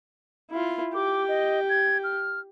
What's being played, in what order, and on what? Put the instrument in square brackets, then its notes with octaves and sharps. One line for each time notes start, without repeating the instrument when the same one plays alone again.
[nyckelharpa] E4 F4
[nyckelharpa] G4 [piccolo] D6
[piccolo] D#5
G#6
F6